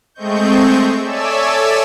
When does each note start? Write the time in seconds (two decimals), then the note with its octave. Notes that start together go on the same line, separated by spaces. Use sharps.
0.14 G#3 A3 C4 D#5 C#6 G6
1.00 A4 C#5 D5 E5 G#5 E6